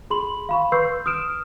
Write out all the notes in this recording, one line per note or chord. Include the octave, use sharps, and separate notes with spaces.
G#4 B5 C6 F#7
F5 B5 C#6
B4 C6 C#6 E6 G6 C7
D#6 F6 D7 E7